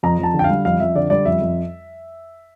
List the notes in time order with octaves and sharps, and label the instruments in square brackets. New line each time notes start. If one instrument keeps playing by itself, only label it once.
[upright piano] F2 A#5
F2 A5
D3
G5
F5
G3
F2 F5
F2 E5
D3 D5
G3 D5
F2 E5
F2